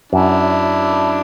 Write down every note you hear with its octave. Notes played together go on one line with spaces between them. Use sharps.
F#2 D4 E4